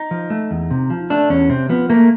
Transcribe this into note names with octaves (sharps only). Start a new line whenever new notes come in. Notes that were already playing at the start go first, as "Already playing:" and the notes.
Already playing: D#4
F3
A3
E2
C3
F3
A3 D4
E2 C#4
C3 C4
F3 B3
A3 A#3